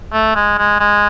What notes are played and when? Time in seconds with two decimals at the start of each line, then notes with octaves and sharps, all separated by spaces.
0.12 A3
0.35 G#3
0.58 G#3
0.80 G#3